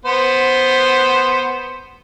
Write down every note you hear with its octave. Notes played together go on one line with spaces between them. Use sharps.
B3 C5